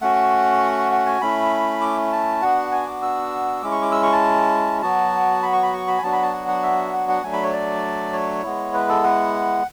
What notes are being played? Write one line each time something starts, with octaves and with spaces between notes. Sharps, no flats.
A3 C#4 F#4 F#5
F#5
G#5
A3 C#4 E4 B5
D6
A5
B3 D4 F#4 F#5
G#5
D6
E6
G#3 C#4 E4 D6
C#6
D6
E6
C#6
A5
F#3 B3 F#4 A5
B5
C#6
B5
C#6
B5
G#5
F#3 B3 D4 F#4 A5
B5
A5
F#5
F#5
E5
F#5
F#5
F#3 A3 D4 G#5
B5
C#5
D5
C#5
G#3 B3 E4
B4
A4
F#5